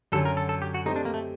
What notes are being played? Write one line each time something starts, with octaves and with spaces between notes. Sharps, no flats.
F#2 D3 F#3 A4
A#4
A4
A4
G4
F#4
A3 C4 D#4 G4 C5 D#5
D4
A#3
A3